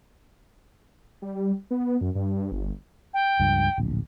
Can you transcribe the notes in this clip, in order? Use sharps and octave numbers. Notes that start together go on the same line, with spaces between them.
G3
B3
F#2
G2
G1
G5
C#2 G2 F3
D1 A#1